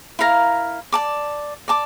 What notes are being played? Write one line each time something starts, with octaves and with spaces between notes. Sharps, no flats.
E4 A#4 F5 A#5
D5 A5 D6
D5 A5 D6